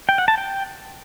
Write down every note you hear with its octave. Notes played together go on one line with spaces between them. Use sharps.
G5
F#5
A5
G5